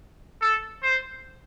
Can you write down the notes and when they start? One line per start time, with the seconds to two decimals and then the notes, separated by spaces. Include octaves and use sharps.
0.41 A4
0.83 C5